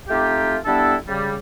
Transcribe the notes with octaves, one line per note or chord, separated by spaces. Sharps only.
A3 C4 D#4 F4 G4
G3 B3 D4 E4 A4
C#3 G3